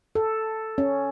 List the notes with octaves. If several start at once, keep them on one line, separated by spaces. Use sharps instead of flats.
A4
C#4